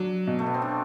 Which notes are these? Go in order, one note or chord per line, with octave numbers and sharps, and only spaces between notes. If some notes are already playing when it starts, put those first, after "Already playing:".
Already playing: F#3 D4
B2
A3
B3
C4
D4